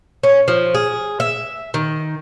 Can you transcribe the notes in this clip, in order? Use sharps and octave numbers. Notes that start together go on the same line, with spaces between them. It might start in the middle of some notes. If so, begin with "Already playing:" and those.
C#4
F3
G#4
E5
D#3